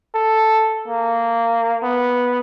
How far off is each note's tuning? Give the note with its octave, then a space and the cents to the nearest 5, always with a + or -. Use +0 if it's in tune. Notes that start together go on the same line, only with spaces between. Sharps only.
A4 +0
A#3 -15
B3 -5